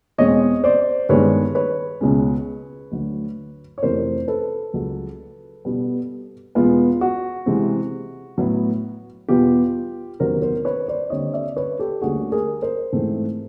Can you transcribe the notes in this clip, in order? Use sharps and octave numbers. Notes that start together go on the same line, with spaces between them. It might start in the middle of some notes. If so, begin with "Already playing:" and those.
E2 B2 G#3 C4 C#5 D#5
C5 D5
G2 D#3 G#3 B3 B4 C#5
B4 C#5
C#2 B2 G#3 C#4
D2 D3 F#3
C#5
F2 C3 E3 A3 C4 A#4 C5
A4 B4
C#2 C#3 F#3
B2 G3 B3
E2 B2 G#3 B3 F4
F#4
C3 E3 G#3 C4
A2 F#3 B3
E2 B2 G3 B3 F4 G4
E2 C3 D#3 F#3 B3 A#4 C5
A#4 C5
B4 C#5
C5 D5
D#2 D3 G3 C4 C#5 D#5
D5 E5
B4 C#5
G4 A4
D2 D3 G3 A#3 C#4 F#4 G#4
G#4 A#4
A#4 C5
G#2 E3 A3 C4